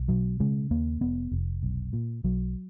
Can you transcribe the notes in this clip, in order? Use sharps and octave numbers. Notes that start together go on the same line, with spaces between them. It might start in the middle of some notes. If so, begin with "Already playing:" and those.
Already playing: B1
B2 F#3
C#3 G#3
D#2 A#3
F1 B3
F1
B1
A#2
B1 F#3